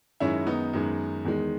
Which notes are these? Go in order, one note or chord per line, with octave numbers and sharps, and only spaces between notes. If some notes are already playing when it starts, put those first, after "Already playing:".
F#2 D#3 G#3 C#4 E4
B3 D#4
F#2 D#3 G#3
E2 D#3 G#3